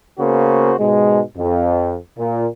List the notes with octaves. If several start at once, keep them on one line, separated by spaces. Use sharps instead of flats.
C#3 A#3 B3 F#4 C5
G#2 B2 G#3
F2
A#2